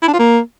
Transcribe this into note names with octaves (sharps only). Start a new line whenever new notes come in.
E4
D4
F4
A#3